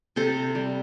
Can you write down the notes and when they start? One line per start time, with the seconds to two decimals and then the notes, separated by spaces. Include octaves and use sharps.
0.16 C3 A4 C5
0.55 G3